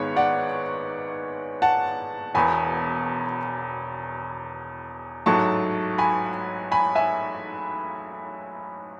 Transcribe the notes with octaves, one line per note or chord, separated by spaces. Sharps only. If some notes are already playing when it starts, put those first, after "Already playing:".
Already playing: G#1 G#2 G#3 B3 C#5
D5 F#5
F#5 A5
E1 E2 B2 G#5 B5
A1 G#2 F#3 A3 A5 C#6
G#5 B5
G#5 B5
E5 G#5